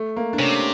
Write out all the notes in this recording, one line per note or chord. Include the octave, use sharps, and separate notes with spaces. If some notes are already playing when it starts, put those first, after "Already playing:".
Already playing: A3
A#3
D4
C3 C#4